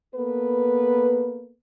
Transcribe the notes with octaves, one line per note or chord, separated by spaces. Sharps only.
A#3 B3 A4 B4